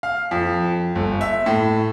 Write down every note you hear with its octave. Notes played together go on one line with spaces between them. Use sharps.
F5
F2
G1
E5
A2